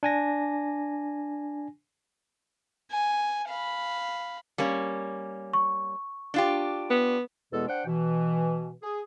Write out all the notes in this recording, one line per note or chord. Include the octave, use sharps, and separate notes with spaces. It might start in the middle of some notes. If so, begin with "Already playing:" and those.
D4 G#5 A#6
G#5
F5 B5
G3 A#3 C#4
C#6
D4 F4 G4
B3
E2 B2 G#3 B3 A4
D4 C5 F#5 G5
B2 E3
G#4